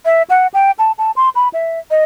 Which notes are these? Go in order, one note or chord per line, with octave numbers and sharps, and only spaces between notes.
E5
F#5
G5
A5
A5
C6
B5
E5
D#5